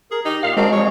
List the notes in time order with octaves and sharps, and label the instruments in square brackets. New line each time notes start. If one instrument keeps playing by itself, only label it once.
[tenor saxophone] G#4 [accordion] A#4
[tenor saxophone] D#4 [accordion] G4
[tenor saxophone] A#2 [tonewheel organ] F5
[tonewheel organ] G#3 [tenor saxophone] C4 [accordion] D4 F#4 A#4
[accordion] F3 G3 [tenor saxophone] C#5